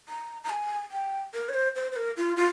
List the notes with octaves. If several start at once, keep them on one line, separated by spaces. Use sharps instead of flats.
A#5
A#5
G#5
G5
A#4
C#5
C5
C5
C5
A#4
F4
F4